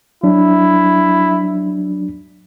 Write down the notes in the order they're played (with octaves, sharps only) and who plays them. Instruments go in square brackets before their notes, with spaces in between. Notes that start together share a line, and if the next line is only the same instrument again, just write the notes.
[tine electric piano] F#3 D4 [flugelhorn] E4